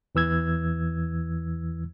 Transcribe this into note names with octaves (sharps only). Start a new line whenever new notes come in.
E2 E3 E6 G#6